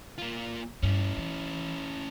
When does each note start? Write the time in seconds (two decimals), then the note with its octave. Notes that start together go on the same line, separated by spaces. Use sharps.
0.18 A#3 F4
0.83 G2 C#4 E4
1.17 E3